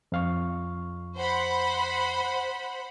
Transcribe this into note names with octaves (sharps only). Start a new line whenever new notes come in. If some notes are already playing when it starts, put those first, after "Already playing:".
F2 F5 C#6
C5 F#5 B5